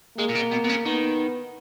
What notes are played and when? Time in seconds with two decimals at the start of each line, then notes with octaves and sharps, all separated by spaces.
0.17 G#3 A#3
0.29 A#2
0.35 B2
0.51 B2
0.64 B2
0.69 C#3
0.85 D#3 B3